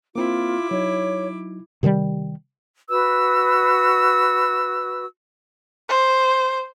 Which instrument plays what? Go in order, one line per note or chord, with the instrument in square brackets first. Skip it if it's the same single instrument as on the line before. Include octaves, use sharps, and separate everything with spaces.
[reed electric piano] A#3 C4 [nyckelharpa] E4 D6 [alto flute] F4
[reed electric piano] F#3 D#4 [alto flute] C#5
[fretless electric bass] C3 D#3 F3 G3
[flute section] F#4 B4 E6
[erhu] C5